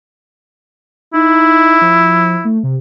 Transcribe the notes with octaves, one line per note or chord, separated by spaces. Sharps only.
D#4 E4
F3
A3
C3